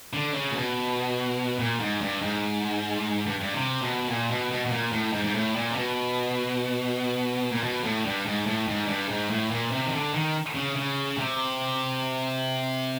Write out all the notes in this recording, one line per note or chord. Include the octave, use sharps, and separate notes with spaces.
D3
C#3
A#2
B2
A#2
G#2
G2
G#2
G2
G2
C3
B2
A#2
B2
B2
B2
A#2
A2
G#2
G#2
A2
A#2
C3
B2
A#2
B2
A2
G2
G#2
A2
G#2
G2
G#2
A2
A#2
C3
D#3
D3
D#3
C#3
C#3
C3